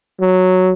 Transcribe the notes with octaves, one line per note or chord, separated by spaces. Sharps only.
F#3